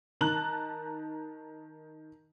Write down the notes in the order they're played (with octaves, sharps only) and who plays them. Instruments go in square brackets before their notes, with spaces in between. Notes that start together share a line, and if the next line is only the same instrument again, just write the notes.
[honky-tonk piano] D#3 A5 A#5 F#6 F#7